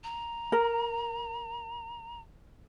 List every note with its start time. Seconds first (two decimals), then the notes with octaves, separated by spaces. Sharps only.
0.04 A#5
0.52 A#4